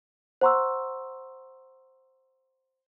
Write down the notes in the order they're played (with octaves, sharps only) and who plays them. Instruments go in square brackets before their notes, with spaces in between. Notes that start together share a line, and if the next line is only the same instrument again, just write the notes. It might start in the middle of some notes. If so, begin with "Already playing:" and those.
[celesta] C5 F#5 A#5 C6 C#6 E6